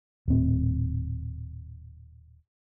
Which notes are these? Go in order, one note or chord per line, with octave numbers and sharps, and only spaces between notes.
D#1 A2 C4